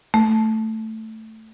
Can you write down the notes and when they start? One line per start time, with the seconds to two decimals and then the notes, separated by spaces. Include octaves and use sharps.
0.14 A3